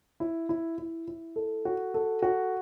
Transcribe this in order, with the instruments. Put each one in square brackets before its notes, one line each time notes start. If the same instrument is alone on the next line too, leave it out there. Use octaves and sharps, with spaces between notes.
[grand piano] E4
E4
E4
E4
A4
F#4
A4
F#4